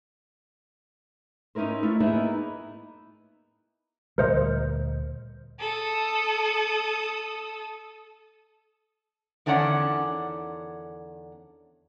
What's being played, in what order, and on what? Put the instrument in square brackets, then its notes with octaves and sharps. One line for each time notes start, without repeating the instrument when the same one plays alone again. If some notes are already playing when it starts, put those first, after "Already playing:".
[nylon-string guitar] C#4 D#4 E4 A#4 C5
A3 E4 F4
A#3 B3 D#4 E4 G#4 D#5
[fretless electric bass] D2 A#2 G3 [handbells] A#4 C5 D#5
[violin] A4 D#6
[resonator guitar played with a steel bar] E2 D3 D#3 C#4 D4 F#5